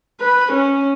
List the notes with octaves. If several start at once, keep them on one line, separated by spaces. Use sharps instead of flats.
B4
C#4